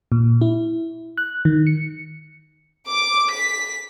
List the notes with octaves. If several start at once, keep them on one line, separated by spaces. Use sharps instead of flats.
A#2
E4
F#6
D#3
C#7
D6
B6